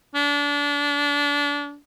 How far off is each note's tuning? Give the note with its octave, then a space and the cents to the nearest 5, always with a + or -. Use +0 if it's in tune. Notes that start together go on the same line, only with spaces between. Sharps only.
D4 -30